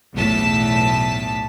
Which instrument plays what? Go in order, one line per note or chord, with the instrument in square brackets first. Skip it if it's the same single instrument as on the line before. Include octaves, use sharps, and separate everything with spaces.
[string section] B1 E2 A2 A5 B6